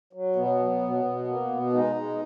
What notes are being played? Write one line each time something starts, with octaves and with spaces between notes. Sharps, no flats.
F#3
B2 B3
F#3
B2
B2
A#3
B2
G#3 D#4
G#3